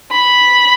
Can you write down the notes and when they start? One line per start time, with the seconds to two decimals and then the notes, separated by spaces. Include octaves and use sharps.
0.12 B5